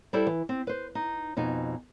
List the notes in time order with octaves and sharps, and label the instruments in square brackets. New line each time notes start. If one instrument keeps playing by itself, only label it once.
[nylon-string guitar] G3 E4 G4 A4 C5 D5
E3
C4
B4 C5
D#4
F2 B2 D#4 G#5